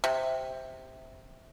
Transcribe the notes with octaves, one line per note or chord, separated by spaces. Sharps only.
C3